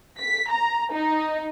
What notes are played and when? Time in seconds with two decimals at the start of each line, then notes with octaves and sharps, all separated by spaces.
0.20 B6
0.50 A#5
0.93 D#4